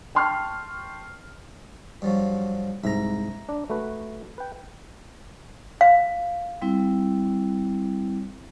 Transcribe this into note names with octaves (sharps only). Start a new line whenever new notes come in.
G5 A5 C6 C#6 F6
G2 F3 F#3
C2 G#2 E5 A#5
D4
A3 F#4 B4
B4 G5
F5
G3 C4 E4